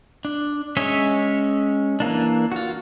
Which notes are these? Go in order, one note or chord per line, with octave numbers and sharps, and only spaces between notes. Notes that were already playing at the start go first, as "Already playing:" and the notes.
D4
G#3 C#4 C#5 D#5 E5
E3 A#3 D4
F4 F#4